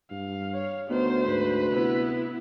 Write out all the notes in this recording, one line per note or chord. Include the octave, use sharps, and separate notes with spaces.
G2 F5
C#5
D2 D#3 B3 C5
G#2 B4
C3 B3 E4